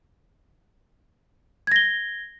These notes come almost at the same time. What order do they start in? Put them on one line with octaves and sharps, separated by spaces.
G#6 A#6 G7